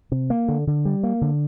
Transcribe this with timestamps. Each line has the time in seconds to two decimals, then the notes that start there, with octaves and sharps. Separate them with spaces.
0.12 C3
0.30 A#3
0.48 D3
0.67 D3
0.85 G3
1.03 A#3
1.21 D3